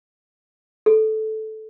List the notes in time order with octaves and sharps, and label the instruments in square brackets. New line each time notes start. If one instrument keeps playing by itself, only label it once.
[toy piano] A4